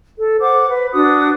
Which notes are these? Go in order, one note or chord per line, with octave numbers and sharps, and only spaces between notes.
A4
C5 F#5 D6
B4
D4 F#4 D#6